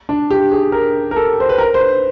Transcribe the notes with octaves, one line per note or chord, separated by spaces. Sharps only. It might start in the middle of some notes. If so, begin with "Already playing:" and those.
D4
G4
G#4
A#4
A#4
A4
C5
B4
A#4
C5
B4